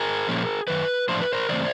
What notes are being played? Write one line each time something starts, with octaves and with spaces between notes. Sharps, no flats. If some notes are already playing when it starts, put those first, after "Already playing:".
Already playing: G#4 A#4
A#2 F3 A#3 C#4
F#2 D#3 B4
A2 F3 A3 D4 C5
B4
A#4 C5
C#3 E3 A3 C4 C5 D5